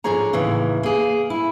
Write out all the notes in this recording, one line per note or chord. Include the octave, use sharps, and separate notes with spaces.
G#2 D3 F3 G#4 C#5 A#5
D#2 A2 C#3 E3
A#3 G#4
E4